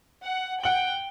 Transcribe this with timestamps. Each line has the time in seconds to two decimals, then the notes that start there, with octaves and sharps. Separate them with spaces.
0.24 F#5
0.64 F#5 G5 F#7